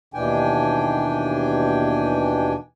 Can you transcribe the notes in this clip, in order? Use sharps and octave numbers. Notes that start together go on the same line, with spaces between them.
D#2 B2 E3 D4 G5 G#5